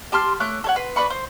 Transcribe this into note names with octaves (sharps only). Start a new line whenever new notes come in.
G4 A5 C6 F6
A3 C#5 D6 F#6
A4 C#5 F#5
B4 C6
D4 B4 B5 C#6
C5